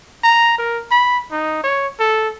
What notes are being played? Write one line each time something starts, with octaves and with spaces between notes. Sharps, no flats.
A#5
A#4
B5
D#4
C#5
A4